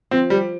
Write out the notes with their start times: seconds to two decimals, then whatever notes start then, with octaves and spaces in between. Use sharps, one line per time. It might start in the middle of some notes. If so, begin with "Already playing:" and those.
0.11 F3 C4
0.30 G3